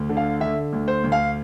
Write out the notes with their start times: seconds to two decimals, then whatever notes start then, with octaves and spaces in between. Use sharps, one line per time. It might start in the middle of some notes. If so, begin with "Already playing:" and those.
Already playing: D2
0.09 D3
0.17 F5
0.40 D3 E5
0.73 D2
0.88 C5
1.04 D2
1.12 F5